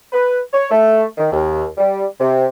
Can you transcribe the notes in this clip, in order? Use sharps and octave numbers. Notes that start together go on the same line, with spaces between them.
B4
C#5
A3
D#3
D#2
G3
C3